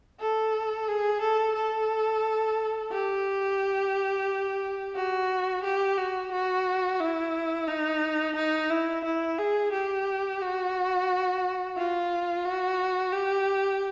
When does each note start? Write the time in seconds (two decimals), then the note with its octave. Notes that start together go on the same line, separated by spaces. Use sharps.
0.20 A4
0.88 G#4
1.21 A4
1.56 A4
2.92 G4
4.95 F#4
5.64 G4
5.97 F#4
6.32 F#4
7.00 E4
7.68 D#4
8.36 D#4
8.70 E4
9.04 E4
9.38 G#4
9.72 G4
10.41 F#4
11.77 F4
12.45 F#4
13.13 G4